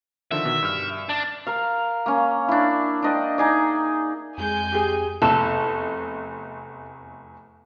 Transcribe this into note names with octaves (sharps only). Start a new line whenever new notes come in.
D3 D#3 F3 E5
B2 D#3
G2 F6
D4
A#4 F5
A#3 C#4
D4 E4
D4 D#5 G5
D#4 G#4 D5
F2 G#3 G#5 G6
G4 G#4
F1 E2 A4 E7